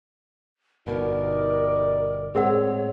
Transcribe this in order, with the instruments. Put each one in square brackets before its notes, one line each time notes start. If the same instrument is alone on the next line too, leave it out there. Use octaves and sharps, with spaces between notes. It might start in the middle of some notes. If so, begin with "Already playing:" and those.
[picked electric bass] G1 B2 [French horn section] G3 D#4 D5 [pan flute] A#4
[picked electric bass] A2 G#3 C4 [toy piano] G#4 A#4 F#5 [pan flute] C#5